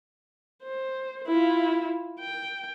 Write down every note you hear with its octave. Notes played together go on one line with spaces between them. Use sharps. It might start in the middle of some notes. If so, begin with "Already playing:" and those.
C5
E4 F4
G5